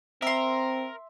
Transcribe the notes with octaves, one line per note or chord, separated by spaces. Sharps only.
C4 A#4 E5 C6